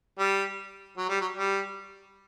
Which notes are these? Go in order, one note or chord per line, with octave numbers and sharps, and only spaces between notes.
G3
F#3
G3
F#3
G3